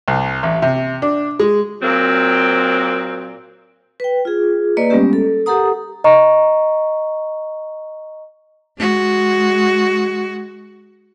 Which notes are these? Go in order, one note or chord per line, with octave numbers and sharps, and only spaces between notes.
C2
A1
C3
D4
G#3
A#2 F#3 A#3 C4
B4 G5
F4 G#4
A#3 B4 D5 D#5
G3 G#3 B3 C#4 G4
A4
G4 A4 A#4 F#5 A#5 D#6
D#5 A#5 C#6
G#3 F#4